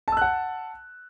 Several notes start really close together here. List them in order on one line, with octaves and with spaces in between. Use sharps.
A5 E6 F#6 F#5